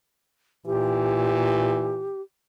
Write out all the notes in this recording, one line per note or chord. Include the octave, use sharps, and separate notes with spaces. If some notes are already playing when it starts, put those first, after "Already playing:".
A#2 E3 G4